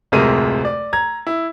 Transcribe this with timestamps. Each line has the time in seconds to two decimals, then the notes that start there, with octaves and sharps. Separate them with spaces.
0.12 D1 F2 C3 G#3 A#4 D#7
0.65 D5
0.93 A#5 G#6
1.27 E4